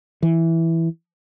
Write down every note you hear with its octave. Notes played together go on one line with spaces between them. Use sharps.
E3